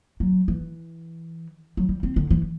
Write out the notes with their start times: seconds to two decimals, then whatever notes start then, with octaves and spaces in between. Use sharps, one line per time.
0.20 F#3
0.48 E3
1.77 F#3
1.89 G3
2.03 C4
2.16 D3
2.30 E3